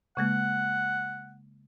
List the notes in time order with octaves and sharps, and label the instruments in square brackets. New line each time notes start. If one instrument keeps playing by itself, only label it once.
[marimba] C#3 G#3 A#3 [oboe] F#5